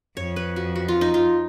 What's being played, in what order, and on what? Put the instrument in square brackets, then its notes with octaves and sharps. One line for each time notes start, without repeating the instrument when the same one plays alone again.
[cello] F2 [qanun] C#5
[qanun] B4
F#4
F#4
F4
D#4
F4